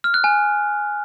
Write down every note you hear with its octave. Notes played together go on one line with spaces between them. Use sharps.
F6
F#6
G#5